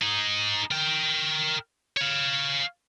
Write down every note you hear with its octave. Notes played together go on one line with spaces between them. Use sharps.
D#4 G#4
A#4 G5
C#5 F5